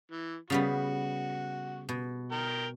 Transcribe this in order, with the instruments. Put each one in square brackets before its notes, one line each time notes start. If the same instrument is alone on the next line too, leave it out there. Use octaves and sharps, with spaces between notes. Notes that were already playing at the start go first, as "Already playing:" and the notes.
[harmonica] E3
[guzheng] C#3 G3 B3 [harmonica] F#4
[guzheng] B2
[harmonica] A#4 G5